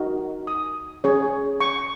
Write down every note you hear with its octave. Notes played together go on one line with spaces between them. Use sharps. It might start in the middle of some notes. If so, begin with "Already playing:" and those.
Already playing: D#4 F#4 A#4
D#6
C#4 G#4 C#5
C#6